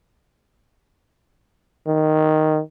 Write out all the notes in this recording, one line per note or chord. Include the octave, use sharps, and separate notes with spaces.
D#3